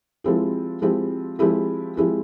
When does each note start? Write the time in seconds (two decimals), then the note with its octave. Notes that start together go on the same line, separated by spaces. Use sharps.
0.24 F3 G#3 C4 E4 G4
0.82 F3 G#3 C4 E4 G4
1.39 F3 G#3 C4 E4 G4
1.97 F3 G#3 C4 E4 G4